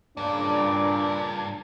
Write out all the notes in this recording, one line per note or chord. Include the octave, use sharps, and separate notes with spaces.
G2 A#2 C#3 D4 D5